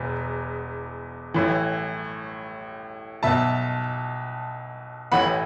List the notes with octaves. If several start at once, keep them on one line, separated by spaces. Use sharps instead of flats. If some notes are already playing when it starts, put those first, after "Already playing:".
Already playing: E1 E2 B2
A1 A2 E3
B1 B2 E5 A5
A1 A2 E3 F#5 B5